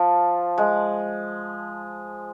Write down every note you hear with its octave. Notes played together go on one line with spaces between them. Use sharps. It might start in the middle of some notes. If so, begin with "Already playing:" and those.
Already playing: F3
G#3